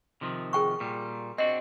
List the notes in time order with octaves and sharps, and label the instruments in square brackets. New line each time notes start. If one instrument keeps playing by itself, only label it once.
[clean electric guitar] C3 D#3 F3
[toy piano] G#4 G5 C#6
[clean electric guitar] A#2 G3
[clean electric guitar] C4 D4 F#4 [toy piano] D#5